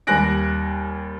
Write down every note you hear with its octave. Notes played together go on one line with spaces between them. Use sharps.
D#2 G3 G#5 F#6 A#6 D7